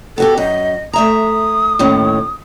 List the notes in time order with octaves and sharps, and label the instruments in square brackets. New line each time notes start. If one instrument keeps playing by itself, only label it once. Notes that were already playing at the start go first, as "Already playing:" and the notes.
[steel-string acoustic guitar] B3 F#4 G4 [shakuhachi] A4
[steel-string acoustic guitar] F#2 [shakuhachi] D#5
[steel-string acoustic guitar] A3 E5 A#5 [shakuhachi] D#6
[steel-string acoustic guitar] D#2 A2 C#4